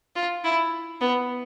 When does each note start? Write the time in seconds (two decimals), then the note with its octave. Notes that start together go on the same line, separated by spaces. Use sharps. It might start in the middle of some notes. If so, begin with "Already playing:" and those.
0.16 F4
0.45 E4
1.01 B3